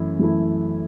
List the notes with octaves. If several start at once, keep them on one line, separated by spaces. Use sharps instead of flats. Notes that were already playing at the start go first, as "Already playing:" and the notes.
Already playing: F#2 E3 A3 E4
F#2 E3 A3 E4